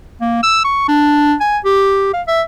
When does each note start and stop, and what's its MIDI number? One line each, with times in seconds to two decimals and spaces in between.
0.21 0.42 58
0.43 0.61 88
0.64 0.86 85
0.88 1.35 62
1.40 1.58 80
1.64 2.13 67
2.13 2.22 77
2.27 2.42 76